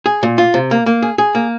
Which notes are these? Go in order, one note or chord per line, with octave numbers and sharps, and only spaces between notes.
G#4
A#2
F4
C3
A#3
A#3
G#4
G#4
A#3